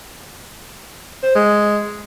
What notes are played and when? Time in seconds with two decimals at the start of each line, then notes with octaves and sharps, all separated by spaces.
1.23 C5
1.35 G#3